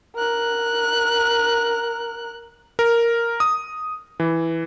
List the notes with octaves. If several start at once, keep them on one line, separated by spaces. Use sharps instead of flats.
A#4 F#6
A#4
D#6
E3